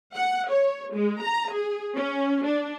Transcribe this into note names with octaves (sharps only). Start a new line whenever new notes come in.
F#5
C#5
G#3
A#5
G#4
C#4
D4